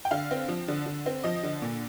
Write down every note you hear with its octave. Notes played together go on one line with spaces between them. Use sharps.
G5
D3 F5
C4
F3
D3
D3
C4
F3 D#5
D3
A#2